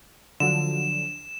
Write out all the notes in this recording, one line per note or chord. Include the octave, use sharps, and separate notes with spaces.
D3 F3 F#3 E7